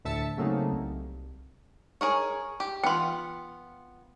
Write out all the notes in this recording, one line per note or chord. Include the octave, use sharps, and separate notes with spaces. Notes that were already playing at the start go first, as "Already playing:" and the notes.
D2 A2 E5 A5 C#7
C#3 F#3 A3 A#3 C4 D#4
C2
G#4 A#4 C#5
G4
B3 F4 G5 C6